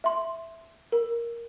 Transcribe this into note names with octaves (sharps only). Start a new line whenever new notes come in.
E5 C6
A#4